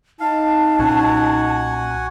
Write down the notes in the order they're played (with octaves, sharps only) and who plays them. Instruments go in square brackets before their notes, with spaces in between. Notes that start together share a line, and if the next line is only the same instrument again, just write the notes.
[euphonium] D#4 [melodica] F5 [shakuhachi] A5
[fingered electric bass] B1 A#2 C#4 [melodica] F#4 F#5 G#5